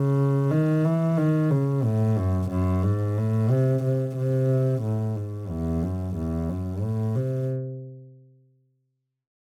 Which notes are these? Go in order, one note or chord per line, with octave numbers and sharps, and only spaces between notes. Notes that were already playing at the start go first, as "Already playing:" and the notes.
Already playing: C#3
D#3
E3
D#3
C#3
A2
F#2
F#2
G#2
A2
C3
C3
C3
A2
G#2
E2
F#2
E2
F#2
A2
C3